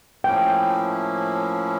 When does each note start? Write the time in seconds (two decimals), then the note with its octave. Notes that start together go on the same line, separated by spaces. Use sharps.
0.24 A2 F3 A#3 C#4 E4 G5